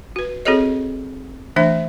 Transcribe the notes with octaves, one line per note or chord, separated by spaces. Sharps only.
F#4 B4
C4 F#4 G#4 A4 C#5 D#5
E3 A3 D4 C5 E5